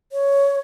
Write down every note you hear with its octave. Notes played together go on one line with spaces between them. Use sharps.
C#5